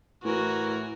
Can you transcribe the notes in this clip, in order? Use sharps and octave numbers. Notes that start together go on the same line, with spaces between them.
A2 E3 F#4 A#4